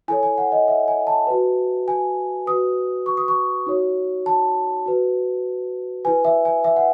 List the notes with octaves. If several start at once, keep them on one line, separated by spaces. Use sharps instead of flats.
E4 A4 C#5 G#5
G#5
F#5
D#5
E5
G#5
A5
F#4 B4
G#5
F#4 B4 D#6
C#6
D#6
C#6
D#4 F#4 C#5
A5
F#4 B4
E4 B4 G#5
E5
G#5
E5
F#5